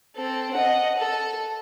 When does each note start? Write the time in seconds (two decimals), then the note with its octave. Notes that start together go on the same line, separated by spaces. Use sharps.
0.16 C4 A4
0.54 D#5 F#5
0.98 A4